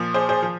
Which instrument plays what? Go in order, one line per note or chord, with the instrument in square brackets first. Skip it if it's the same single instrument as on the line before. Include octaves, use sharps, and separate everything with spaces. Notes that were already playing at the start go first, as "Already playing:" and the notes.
Already playing: [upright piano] A#2 F3
G#4 C5
G#4 C5
F3